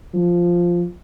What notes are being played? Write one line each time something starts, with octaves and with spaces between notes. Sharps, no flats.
F3